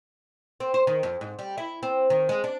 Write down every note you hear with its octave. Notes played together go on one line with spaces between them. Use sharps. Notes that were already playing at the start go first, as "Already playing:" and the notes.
C4
C5
D#3
F2
G#2
G3
E4
C4
D#3
G#3
D4